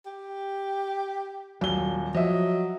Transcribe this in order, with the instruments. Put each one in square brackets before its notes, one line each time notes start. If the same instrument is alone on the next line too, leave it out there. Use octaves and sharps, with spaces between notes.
[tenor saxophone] G4
[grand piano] D#1 G7 [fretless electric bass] F#3
[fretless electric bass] F3 [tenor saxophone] F#3 [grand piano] D#5 E5